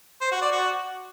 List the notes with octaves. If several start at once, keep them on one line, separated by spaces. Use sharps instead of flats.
C5
F#4
D5
F#4